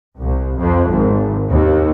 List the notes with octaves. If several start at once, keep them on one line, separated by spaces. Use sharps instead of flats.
C2
F2
G#1
D#2